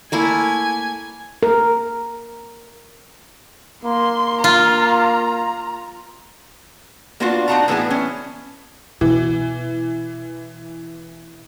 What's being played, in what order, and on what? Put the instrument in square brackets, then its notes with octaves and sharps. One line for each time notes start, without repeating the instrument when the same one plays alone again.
[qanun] A3 A#3 E4 [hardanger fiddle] G#5
[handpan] A#4
[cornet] A#3 [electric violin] C6
[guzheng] F4 [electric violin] A#5
[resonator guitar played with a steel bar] A#3 B3 D4 F4 F#4 F5
D4 D#4 F#4 F#5 A5 A#5
A2 E3 B3 G#4 G#5 A5
B3 C#4
[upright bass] B2 [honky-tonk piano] E3